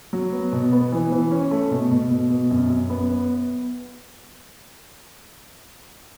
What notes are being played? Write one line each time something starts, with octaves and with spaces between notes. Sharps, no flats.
F#3
B3
B2
B3
E3
E3
C#4
A3
B2
B2
B2
B2
F#2
F#2
B3
B3